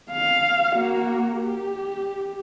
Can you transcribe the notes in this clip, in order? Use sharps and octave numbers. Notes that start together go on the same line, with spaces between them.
F5
A#3 F#4
G4